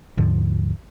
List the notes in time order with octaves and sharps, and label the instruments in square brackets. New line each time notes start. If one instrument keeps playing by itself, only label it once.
[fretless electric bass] D#2 G#2 D3 F3